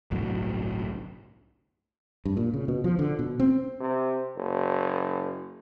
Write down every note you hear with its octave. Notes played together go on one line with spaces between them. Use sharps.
G1 C2 A2 F#3
G2
A#2
C#3
B2
F3
D3
B2
C4
C3
F#1